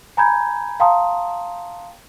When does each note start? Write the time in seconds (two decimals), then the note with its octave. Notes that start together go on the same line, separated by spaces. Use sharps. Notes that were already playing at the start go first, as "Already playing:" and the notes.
0.17 G#5 A#5 B5 G6 G#6
0.80 F5 G5 A5 A#5 C6 D#6